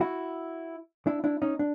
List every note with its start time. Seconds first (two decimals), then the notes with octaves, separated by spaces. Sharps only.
0.01 E4 F#4
1.07 D4 E4
1.24 D4 E4
1.42 C#4 D#4
1.59 D4